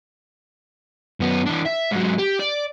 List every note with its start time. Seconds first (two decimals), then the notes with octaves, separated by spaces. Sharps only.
1.20 F#2 B3
1.46 E3 D4
1.66 E5
1.92 G#2 F#3
2.19 G4
2.40 D5